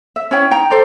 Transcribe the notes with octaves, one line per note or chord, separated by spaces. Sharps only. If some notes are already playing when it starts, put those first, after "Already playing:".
E5
C#4 E4 C#5 G5
D#4 G5 A#5
A4 C5 D5 A#5